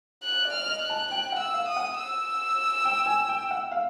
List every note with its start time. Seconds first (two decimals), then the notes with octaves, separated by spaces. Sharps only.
0.23 F#6
0.45 D5
0.53 F6
0.67 D#5
0.82 F#6
0.90 A5
1.11 G5 F#6
1.32 F#5
1.39 E6
1.54 F5
1.68 D#6
1.76 F#5
1.98 E6
2.85 G5
3.06 G#5
3.29 G5
3.51 F#5
3.71 F5